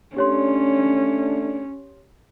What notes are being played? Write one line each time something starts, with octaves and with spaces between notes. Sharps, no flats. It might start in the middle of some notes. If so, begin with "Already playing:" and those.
A3 C#4 D4 G4 C#5 C6